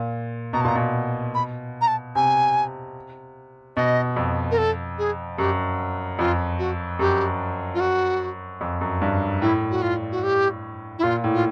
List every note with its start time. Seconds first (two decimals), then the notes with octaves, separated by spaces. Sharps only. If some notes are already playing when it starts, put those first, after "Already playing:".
Already playing: A#2
0.53 B2 A#5
0.61 A5
0.64 A#2 A#5
0.75 B2
1.35 B5
1.81 A#5
1.88 A5
2.15 C3 G#5
3.77 B2 D#5
4.16 F2
4.51 A#4
4.58 A4
4.98 G#4
5.38 F#2 G4
6.19 F2 F4
6.59 F#4
6.99 F#2 G4
7.75 F4
7.80 F#4
8.61 F2
8.81 F#2
9.02 G2
9.41 A2 E4
9.71 F#4
9.82 F4
10.12 F#4
10.23 G4
10.99 E4
11.03 A#2 F4
11.24 A2
11.34 F4